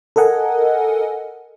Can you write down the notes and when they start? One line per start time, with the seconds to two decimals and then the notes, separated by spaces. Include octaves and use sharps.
0.16 A4 A#4 D#5 F#5 G#5